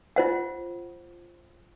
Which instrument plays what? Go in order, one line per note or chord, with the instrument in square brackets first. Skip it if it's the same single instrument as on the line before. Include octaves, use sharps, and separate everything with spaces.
[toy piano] F4 C5 F#5